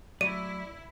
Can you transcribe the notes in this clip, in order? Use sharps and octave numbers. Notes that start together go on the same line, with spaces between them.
F#3 A3 E4 D5 D#7